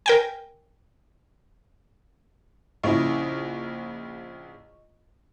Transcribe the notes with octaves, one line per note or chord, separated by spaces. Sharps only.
A#4 G5 G#5
A#1 C#3 E4 D#5 C#6